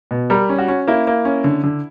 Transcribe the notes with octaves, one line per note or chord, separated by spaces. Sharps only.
B2
G3 A#4
C#4
F#4
C#4
A#3 E4
A#3
C#4
D3
D3